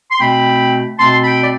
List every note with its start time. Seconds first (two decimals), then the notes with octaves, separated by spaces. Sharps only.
0.11 C6
0.20 B2 A3 C4 G5 B5
0.98 B2 A3 C4 A5 C6
1.24 G5 B5
1.43 D5